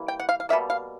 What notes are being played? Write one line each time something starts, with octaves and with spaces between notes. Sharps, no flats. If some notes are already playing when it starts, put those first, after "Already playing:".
Already playing: E3 G3 A#3
G5
F#5
F5
F5
B2 G3 A#3 E5
F5